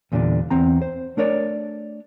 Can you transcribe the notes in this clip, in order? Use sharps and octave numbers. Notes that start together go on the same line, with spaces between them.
E2 A#2 D3 G3 D4
E2 C4 A#5
C5
A3 D4 A#4 C#5 D5